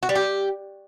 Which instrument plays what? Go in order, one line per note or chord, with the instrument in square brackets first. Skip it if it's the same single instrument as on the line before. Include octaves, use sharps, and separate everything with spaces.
[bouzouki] F#4
G3
G4